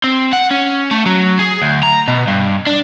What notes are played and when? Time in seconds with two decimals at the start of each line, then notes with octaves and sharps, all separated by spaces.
0.04 C4
0.33 F#5
0.51 C#4
0.91 A3
1.06 F#3
1.39 G#4
1.62 D2
1.83 A#5
2.08 B2
2.27 G2
2.67 D4